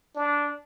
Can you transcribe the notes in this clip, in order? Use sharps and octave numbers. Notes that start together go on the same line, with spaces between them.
D4